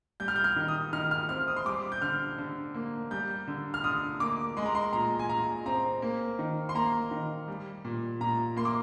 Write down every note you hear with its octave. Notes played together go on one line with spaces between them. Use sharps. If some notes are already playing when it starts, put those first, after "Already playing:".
G3 G6
F6
G6
F6
D#3
D#6
D#3 F6
F6
C4 F6
D#6
C6
G3 D6
G6
D3 F6
D3
A#3
G3 G6
D3
F6
D3 D#6
A#3 D6
G#3 C6
A#5
C6
A#2 A#5
G#5
A#2 A#5
C4 A#5
A#3
D#3
C6
A#3 A#5
D#3
G3
A#2
A#2 A#5
A#3 C6
D6